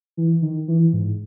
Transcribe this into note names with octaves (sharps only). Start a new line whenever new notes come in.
E3
D#3
E3
G#2